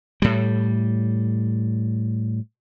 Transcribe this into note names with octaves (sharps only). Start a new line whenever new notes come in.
A2 G3